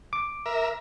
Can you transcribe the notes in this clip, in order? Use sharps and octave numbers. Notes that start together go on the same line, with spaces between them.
D6
A#4 E5